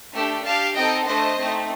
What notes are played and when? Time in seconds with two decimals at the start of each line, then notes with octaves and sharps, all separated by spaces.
0.13 A3 D4 G4
0.44 D4 G4 F5 A5
0.75 C4 D#4 A4 D#5 G5
1.06 A3 D4 A4 C5 D#5
1.37 A3 C4 D#4